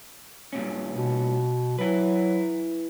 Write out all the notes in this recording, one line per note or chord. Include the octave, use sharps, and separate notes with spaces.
G2 A#2 C#4
B2
F#3 E4 B4